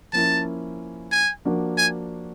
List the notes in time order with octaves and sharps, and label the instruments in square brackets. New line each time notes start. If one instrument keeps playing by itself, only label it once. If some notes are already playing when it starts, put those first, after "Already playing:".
[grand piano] F3 A#3 C#4 E4 [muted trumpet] A5
[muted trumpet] G#5
[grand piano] F3 A#3 D4 F#4
[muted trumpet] G#5